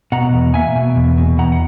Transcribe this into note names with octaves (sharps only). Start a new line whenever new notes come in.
B2 F#5 A#5
E2
A#3 E5 G#5
B2
E2
B2
E2 F#5 A#5
F#5